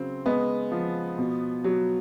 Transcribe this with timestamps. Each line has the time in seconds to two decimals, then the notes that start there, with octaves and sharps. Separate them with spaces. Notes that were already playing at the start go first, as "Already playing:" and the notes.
Already playing: C#3 F#3 C4
0.26 G#3 B3
0.72 F3
1.18 B2
1.64 F#3